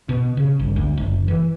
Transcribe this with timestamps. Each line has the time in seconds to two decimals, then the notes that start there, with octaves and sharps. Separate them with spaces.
0.09 B2
0.37 C#3
0.59 G1
0.76 D2
0.97 F#1
1.28 E3